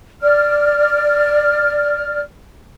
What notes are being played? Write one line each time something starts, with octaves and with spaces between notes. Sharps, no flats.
D5 F6